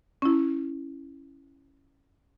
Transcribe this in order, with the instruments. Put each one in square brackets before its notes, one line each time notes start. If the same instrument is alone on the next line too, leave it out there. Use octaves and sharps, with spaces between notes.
[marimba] C#4 E4